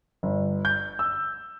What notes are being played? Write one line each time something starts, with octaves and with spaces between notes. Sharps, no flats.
G1
G6
E6